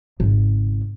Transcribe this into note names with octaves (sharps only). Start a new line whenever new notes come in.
G#1 C#3